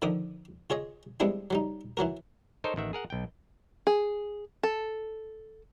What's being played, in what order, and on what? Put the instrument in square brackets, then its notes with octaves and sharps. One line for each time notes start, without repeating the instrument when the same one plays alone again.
[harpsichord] D3 D#3 F3 D6 D#6
F4 G#4 C#5 D#5
G3 G#3 B3 C4 D4 E4
F#3 G3 D#4
E3 F#3 F#4 A#4
[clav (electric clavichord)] D#4 A4 A#4 C5 C#5 D#5
A1 D#3 E5 F#5
G#4 A#4 F#5
B1 G5
[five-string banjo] G#4
A4